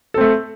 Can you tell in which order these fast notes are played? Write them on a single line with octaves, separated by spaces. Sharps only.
A4 C4 A3